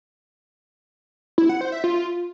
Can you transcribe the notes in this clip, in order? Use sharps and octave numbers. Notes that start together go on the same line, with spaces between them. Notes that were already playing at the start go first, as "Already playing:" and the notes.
E4
F#5
C5
E5
F4